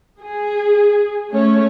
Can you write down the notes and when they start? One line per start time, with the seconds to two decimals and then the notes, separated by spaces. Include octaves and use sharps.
0.20 G#4
1.30 A3 C#4 C#5